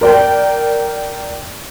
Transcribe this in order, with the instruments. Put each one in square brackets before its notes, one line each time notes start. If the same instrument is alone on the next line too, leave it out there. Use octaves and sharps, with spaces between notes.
[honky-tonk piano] A#4 D5 G5